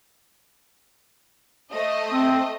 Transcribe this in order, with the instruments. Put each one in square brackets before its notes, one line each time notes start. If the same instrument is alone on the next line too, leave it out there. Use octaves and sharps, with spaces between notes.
[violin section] A3 C5 D#5
[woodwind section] C4